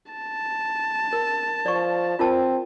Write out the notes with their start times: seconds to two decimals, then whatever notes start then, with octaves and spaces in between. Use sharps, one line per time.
0.12 A5
1.13 A#4
1.66 F3 D5 C#6
2.19 C4 F4 A#4 A5